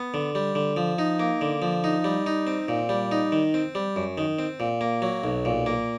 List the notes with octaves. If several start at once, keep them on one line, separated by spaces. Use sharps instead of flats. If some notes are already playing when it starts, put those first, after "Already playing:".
Already playing: B3
D3
G3
D3
F3
D#4
A#3
D3
F3
D#4
G3
D#4
C4
A#2
G3
D#4
D#3
C4
G3
F#2
D#3
C4
A#2
A#3
F#3
B1
A#2
A#3